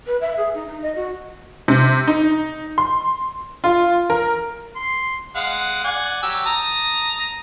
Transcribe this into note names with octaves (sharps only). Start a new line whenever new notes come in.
B4
E5
G#4
D#4
D#4
D#5
F#4
C3
D#4
C6
F4
A#4
C6
G#3 F5 F#5
D5 F#5 G#5
F#3 G4 E6
A5 A#5 D#6